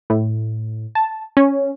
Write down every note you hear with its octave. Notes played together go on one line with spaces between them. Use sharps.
A2
A5
C#4